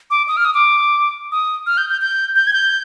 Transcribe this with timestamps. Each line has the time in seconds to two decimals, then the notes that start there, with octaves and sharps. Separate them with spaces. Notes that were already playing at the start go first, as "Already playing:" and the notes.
0.11 D6
0.28 D#6
0.37 F6
0.45 D#6
0.54 D6
1.32 D#6
1.67 F6
1.78 G6
1.90 G6
2.01 G6
2.36 G6
2.47 G#6
2.53 G6